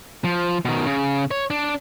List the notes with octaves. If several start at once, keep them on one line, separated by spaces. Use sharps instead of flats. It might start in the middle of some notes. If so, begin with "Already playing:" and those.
F3
B2 D#3
C#3
C#5
D4